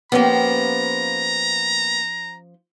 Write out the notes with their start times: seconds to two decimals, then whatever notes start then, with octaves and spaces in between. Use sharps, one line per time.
0.12 F3 A#3 B3 C#4 G4 A#5